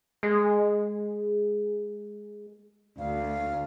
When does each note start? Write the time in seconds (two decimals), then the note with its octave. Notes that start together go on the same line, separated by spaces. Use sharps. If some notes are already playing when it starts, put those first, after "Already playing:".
0.23 G#3 G#4
2.99 D2 F5